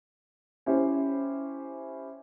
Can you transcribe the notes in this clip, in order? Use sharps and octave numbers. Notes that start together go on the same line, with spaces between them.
C#4 E4 G4 C5